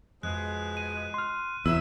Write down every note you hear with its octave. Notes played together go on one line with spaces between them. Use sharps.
F2 B2 F3 G#3 F#6
D#7
C6 F6
E2 F#3 E5 E6